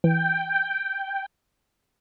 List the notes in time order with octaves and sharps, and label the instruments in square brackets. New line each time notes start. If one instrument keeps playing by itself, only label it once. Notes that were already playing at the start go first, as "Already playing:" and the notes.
[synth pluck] E3 [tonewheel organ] G5